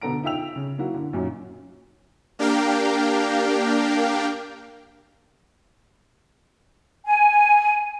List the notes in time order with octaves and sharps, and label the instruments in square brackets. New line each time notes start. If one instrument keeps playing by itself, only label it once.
[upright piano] B2 D3 B3 A4 A#5 D7
D#4 F4 E5 G5 E6 F7
C#3
F#3 A#3 E4 F#4
D3
F#2 A#2 F#3 C#4 D#4
[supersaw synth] A#3 D4 G4 A#4 F5 G5
[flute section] G#5